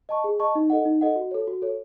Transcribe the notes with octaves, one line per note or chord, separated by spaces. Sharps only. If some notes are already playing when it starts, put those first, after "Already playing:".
D#5 A5 C#6
G#4
D#5 A5 C#6
D#4
A4 D#5 F#5
D#4
A4 D#5 F#5
F#4
A4 C#5
F#4
A4 C#5